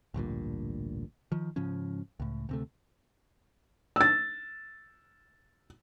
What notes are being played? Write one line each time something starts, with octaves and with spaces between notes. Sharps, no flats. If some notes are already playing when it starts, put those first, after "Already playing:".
A1 D2 G2 A#2
D#3 F3
G#2 C#3 F3 C#4
C#2 A2
D2 C3 A3
E6 A6